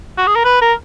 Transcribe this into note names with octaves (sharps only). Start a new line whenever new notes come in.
F#4
G#4
A#4
B4
A#4